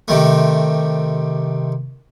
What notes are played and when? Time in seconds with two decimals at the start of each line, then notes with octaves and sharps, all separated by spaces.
0.08 C3 D#3 A3